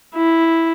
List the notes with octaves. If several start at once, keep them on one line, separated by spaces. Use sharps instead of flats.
E4